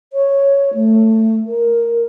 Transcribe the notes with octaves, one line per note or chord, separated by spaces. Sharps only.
C#5
A3
A#4